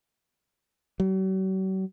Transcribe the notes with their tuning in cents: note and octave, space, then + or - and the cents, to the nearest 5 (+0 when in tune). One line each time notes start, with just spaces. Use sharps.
F#3 +45